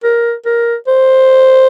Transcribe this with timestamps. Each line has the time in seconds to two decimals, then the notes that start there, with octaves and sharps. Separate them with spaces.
0.04 A#4
0.46 A#4
0.88 C5